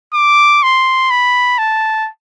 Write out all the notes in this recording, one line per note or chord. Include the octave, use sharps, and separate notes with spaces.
D6
C6
B5
A5